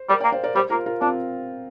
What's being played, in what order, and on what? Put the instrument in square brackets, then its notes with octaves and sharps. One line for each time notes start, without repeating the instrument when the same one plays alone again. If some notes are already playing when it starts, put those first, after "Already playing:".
Already playing: [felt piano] C5
[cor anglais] G3 [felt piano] A#4 D5
[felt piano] D5 G5
[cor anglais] A#3
[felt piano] C5 F5
A#4 D5
[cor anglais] G3 [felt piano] G4 C5
[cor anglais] A#3 [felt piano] F4 A#4
[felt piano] F4 A#4
[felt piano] C4 F4 [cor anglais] D4